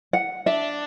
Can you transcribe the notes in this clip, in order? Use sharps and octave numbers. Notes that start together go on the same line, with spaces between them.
F#5
D4 E5